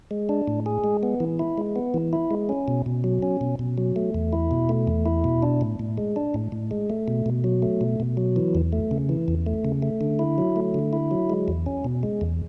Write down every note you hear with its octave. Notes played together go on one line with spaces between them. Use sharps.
G#3
D4
A2
G#4
G#3
B3
E3
E4
G#3
B3
E3
E4
G#3
C#4
B2
B2
F#3
C#4
B2
B2
F#3
A3
E2
E4
B2
A3
E2
E4
B2
D4
A2
A2
G#3
D4
A2
A2
G#3
A3
B2
B2
F#3
A3
B2
B2
F#3
E3
E2
A3
C#3
E3
E2
A3
C#3
A3
D3
E4
F#3
A3
D3
E4
F#3
G#3
E2
C#4
B2
G#3
E2